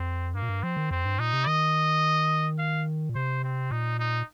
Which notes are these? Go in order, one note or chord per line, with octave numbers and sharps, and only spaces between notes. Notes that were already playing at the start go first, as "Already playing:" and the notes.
Already playing: F2 C4
G2 A#3
A#2
G2
F3 C4
D#3
F2 C4
G2
A#2 D#4
C3
D#3 D#5
F5
A#2
C3 C5
C4
A#2 D#4
D#4